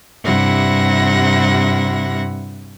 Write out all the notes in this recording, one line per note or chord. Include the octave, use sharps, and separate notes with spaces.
G2 C3 E4 F#5 A#6